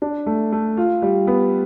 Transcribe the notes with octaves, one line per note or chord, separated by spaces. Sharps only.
D4
A3
A3
F4
G3
B3